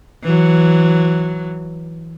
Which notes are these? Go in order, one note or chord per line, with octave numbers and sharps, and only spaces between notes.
E3 F#3